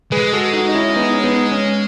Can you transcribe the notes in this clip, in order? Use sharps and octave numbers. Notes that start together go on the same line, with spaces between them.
G#3 G#4 B4
F#4 A4
D#4 F#4
D#4
C#4 E4
B3 D#4
C#4
B3 D#4
C#4